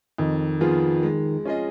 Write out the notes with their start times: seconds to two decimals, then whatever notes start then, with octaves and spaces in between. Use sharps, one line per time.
0.18 F2 D#3
0.61 F3 B3 F4 G#4
1.03 G#3
1.45 C#4 F4 G#4 D#5